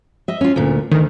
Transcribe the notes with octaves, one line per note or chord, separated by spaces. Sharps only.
D#5 E5
C#4 F4
D2 A#2
D2 D#3